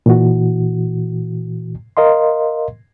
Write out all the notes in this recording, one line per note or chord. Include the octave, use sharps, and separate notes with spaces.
A#2 E3 F#4
A#4 D#5 F5 C6